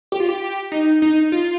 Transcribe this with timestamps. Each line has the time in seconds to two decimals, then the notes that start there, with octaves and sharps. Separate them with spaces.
0.12 G4
0.20 F4
0.29 G4
0.72 D#4
1.02 D#4
1.32 F4